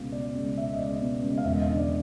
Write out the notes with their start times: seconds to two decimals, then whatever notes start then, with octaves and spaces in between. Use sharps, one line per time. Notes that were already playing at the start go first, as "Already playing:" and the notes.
Already playing: C#2 B2 F5
0.12 B2 D5
0.35 C#2
0.57 B2 E5
0.73 D#5
0.78 C#2 D5
1.01 B2
1.22 C#2
1.38 F5
1.44 E1 E5
1.56 D#5
1.67 D3 D#5
1.77 D5